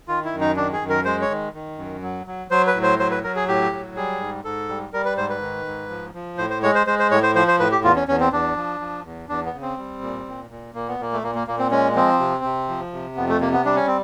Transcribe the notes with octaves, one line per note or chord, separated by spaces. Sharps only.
D#3 F4
E4
F#2
D#4
D#3 D4
G#4
F#2
A#4
G#3 C5
C#5
D#3
D#3
F#2
F#3
F#3
F#3 C5
B4
A2
C5
F#3 C5
B4
F#3 A#4
G#4
A2 G4
F#3
G3 G#4
G#2
G#2 A4
G3
G3 A#4
B4
G#2 C5
B4
D#3
G#2
F3
F3
A2 C5
C5
G#3 C#5
C5
G#3 C5
C5
A2 C#5
C5
F3 C5
C5
A2 B4
G4
E2 F4
C#4
E2 C#4
C4
E2 D4
F3
F3
E2
E2 D4
B3
C#3
C4
G3
A#2
A#2
A#2
A#2 A#3
B3
A#2 A#3
A3
A#2 A#3
A#3
A#2 A#3
C4
G#3 C#4
F3 C4
C3
C3
F3
C3
F2 B3
A3
C3 A#3
B3
G3 D4
C#4
C4